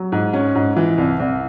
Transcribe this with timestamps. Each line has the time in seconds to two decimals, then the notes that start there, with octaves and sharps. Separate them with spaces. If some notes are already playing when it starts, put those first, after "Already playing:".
Already playing: F#3
0.12 G#2
0.33 C#4
0.55 G#2
0.77 E3
0.98 C2
1.20 C2